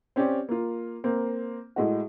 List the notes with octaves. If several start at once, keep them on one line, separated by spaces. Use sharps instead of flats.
C4 C#4 G4 D5
A#3 F4
A#3 C4
A2 G#3 F#4